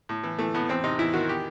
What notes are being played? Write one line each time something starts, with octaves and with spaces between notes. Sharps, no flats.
A2
E3
E3 A3
A2 B3
E2 C4
C3 D#4
E2 E4
D#3 F#4
G4